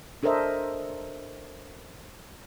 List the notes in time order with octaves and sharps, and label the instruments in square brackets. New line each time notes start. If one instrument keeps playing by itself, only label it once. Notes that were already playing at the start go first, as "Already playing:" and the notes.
[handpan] D4 A4 A#4 C5 D#5 E5